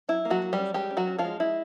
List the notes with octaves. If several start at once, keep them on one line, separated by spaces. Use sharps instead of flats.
F#3 E4
A#3
F#3 F#4
F#3
G3 G4
C#4
G3 G#3 G4
C#4
F#3 F#4
C#4
F3 F4
G#3
G#3 E4